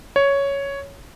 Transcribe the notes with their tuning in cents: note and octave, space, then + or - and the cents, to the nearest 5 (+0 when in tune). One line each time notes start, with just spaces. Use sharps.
C#5 +5